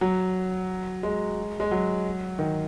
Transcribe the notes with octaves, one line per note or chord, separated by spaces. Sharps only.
F#3
G#3
G#3
F#3
D#3